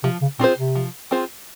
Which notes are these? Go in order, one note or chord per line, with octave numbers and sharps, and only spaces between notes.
C3 F3
C#3
A#2 C4 F4 G#4 C5
C3
F3
C4 F4 G#4 C5